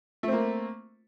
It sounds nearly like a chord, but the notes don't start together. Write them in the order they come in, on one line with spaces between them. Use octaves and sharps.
A3 C4 A#3